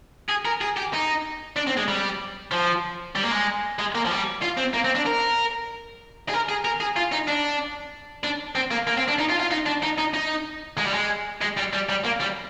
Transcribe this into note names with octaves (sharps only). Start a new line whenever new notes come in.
G#4
A#4
G#4
G4
D#4
D4
C4
G#3
G3
F3
G3
A#3
G#3
G#3
A#3
F3
G3
F4
C4
A#3
C4
D4
A#4
G#4
A#4
G#4
A#4
G#4
F4
D#4
D4
D4
C4
A#3
A#3
C4
D4
D#4
F4
F4
D#4
D4
D#4
D#4
D#4
G#3
G3
G#3
G#3
G3
G3
G3
A#3
G3